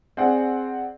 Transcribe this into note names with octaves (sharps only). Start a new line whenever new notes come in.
C4 G#4 D5 F#5